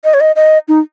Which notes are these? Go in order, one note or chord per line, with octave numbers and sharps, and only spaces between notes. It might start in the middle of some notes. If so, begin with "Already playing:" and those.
D#5
C#5
D#5
D#5
D#4